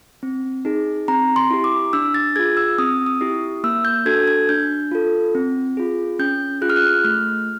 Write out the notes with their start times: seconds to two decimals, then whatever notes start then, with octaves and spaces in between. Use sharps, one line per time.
0.23 C4
0.65 D#4 G#4
1.08 C4 A#5
1.36 C6
1.51 E4 G4
1.64 D6
1.93 D4 E6
2.14 A6
2.36 F4 G#4 G#6
2.57 E6
2.78 C4 D#6
3.06 D#6
3.21 E4 G4
3.64 A#3 E6
3.85 G6
4.06 D4 F#4 A4 G#6
4.28 G#6
4.49 D4 G6
4.91 F4 A4
5.35 C4
5.77 F4 G#4
6.19 C#4 G6
6.62 F4 G#4 F#6
6.70 F6
6.76 F#6
7.04 A3 F6